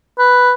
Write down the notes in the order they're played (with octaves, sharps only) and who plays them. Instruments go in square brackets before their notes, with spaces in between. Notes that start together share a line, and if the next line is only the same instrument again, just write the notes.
[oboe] B4